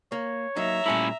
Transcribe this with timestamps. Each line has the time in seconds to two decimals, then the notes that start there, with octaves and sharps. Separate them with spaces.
0.12 A#3 C#5
0.56 F#3 A#3 D#4 E5 A#5
0.86 A#2 G3 A3 C#4 E4